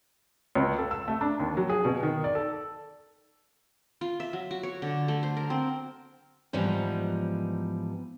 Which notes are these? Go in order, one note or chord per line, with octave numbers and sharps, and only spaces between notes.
C#2
A4
E6
A3
D4
D#2
F#3
G#4
B2
D#3
D5
A4
F4
E5
F#3
F#4
C#5
D3
A3
C5
A#4
C4
G#2 E3 F3 G3 B3 D#4